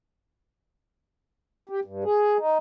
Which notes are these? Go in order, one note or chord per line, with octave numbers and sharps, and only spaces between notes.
G4
G2
G#4
D#4